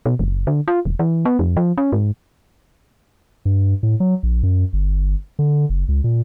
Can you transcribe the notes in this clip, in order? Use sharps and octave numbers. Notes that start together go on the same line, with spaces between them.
B2
F#1
D3
F4
E1
E3
B3
F2
F3
C#4
G#2
G2
A2
F#3
A#1
F#2
G1
D3
F#1
C#2
A#2